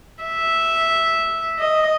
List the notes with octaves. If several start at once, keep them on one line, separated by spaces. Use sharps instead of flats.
E5
D#5